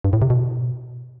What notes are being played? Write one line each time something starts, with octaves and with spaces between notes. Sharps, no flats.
G2
A2
C3
B2